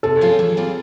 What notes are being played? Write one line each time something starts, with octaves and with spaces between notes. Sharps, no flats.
C3 A4
F3 G#3 C#4 F4
E3
G3 C4 F4 G#4